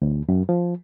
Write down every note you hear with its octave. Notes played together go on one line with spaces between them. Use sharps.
D2
F#2
F3